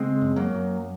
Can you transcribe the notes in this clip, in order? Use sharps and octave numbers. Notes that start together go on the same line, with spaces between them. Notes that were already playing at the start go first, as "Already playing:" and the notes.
Already playing: C#3 G#3 C4
F#2
F#3 A#3
F#2